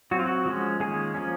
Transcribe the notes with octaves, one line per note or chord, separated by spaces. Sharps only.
F#3 C4 F#4
F4
F#4
F3 G#3 C#4
D#3 G#3 A#3 C#4 G#4
F3 A#3 C#4